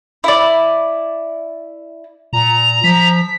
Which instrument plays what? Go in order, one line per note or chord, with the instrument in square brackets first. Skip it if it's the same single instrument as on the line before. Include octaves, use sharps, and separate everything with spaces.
[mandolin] E4 D5
[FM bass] A#2 [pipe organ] A#5
[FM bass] F3 [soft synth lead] B6